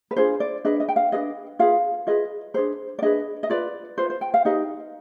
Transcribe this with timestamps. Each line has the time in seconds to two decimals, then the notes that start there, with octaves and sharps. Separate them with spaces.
0.11 B4
0.16 D4 F4 G#4 C5
0.40 D5
0.65 D4 G#4 B4 D#5
0.80 D#5
0.88 G5
0.96 F5
1.12 D4 G#4 B4 D#5
1.59 F4 G#4 B4 F5
2.07 F4 G#4 B4 D#5
2.54 D4 G#4 B4 C5
2.99 D5
3.02 D4 G#4 B4 D#5
3.43 D#5
3.50 F4 B4 D5
3.98 F4 B4 C5
4.10 C5
4.21 G5
4.34 F5
4.45 D#4 G4 B4 D#5